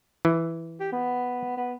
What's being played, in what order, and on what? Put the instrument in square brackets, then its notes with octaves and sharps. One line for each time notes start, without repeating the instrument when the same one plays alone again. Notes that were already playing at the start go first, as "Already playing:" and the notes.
[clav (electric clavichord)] E3
[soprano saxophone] G4
B3
B3